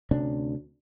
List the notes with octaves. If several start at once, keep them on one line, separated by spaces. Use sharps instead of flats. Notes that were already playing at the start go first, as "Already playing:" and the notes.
D2 C3 C#4 D4